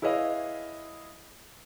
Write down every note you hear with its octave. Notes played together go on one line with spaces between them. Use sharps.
E4 G#4 B4 C#5 D#5 F5